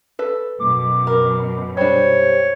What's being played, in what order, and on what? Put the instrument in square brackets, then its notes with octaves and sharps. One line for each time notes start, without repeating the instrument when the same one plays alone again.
[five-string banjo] A4 B4
[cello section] F#2 B2 [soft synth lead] D6
[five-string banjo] A#4
[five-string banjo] G3 D4 [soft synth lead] C5 [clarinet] C#5